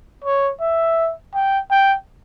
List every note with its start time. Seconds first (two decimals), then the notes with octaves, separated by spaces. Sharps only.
0.25 C#5
0.61 E5
1.34 G5
1.70 G5